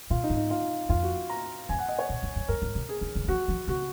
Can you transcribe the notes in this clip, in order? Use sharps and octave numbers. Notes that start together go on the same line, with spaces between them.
A#2 F4
D#4
G#2
D#4
F4
F2 F4
F#4
A#5
F#2 G#5
F#5
D#5
C#5
A#2
F2
F#2
F#2 A#4
G#2
C3
G#4
D#3
C#3
F#3
F3 F#4
F3
C#3 F#4